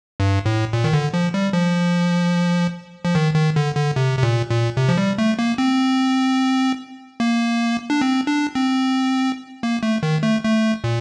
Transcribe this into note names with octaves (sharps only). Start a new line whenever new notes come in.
G2
A2
A#2
D#3
D3
F3
G3
F3
F3
D#3
D#3
D3
D3
C3
C3
A#2
A#2
C3
F3
G3
A3
A#3
C4
A#3
D4
C4
D4
C4
A#3
A3
D#3
A3
A3
A#2